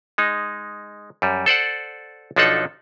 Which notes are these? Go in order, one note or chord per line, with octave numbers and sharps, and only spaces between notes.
G#3 D#4
F#2 G3
A4 C5 D5 F#5
B1 F3 D4 D#4 A4 F#5